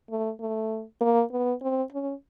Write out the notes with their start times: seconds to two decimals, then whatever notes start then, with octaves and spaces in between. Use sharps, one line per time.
0.10 A3
0.41 A3
1.01 A#3
1.32 B3
1.62 C4
1.92 C#4